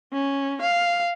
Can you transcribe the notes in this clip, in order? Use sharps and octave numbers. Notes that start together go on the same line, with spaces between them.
C#4
F5